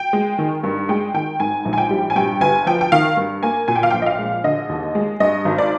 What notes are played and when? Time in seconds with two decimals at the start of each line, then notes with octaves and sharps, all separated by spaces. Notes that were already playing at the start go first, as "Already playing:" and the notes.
Already playing: G5
0.13 G#3
0.39 D#3
0.63 G2
0.89 G#3 G5
1.14 D#3 G5
1.40 G#2 G#5
1.65 A#1
1.73 G#5
1.78 G5
1.91 G3
2.10 G#5
2.16 G2 G5
2.41 G1 G#5
2.67 F3 G5
2.81 G5
2.92 D#3 F5
3.17 G2
3.43 A#3 G#5
3.68 A#2 G#5
3.76 G5
3.83 F5
3.91 A#1 G5
4.02 D#5
4.06 F5
4.19 G#3
4.44 D3 D#5
4.69 D#2
4.95 G#3
5.20 G2 D#5
5.45 G#1
5.58 D5